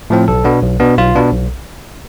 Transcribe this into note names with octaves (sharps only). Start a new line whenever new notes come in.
A2 F3 C4
B1 A4
B2 B3 D4
B1
B2 B3 D4
B1 F4
B2 B3 D4
B1